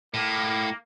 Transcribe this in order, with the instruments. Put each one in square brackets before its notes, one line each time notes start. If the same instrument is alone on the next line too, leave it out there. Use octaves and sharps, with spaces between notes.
[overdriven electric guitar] A2 [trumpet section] A#3